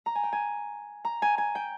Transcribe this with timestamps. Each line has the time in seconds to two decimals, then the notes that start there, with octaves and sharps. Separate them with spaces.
0.06 A#5
0.15 G#5
0.23 G5
0.33 G#5
1.05 A#5
1.22 G#5
1.38 G#5
1.55 G5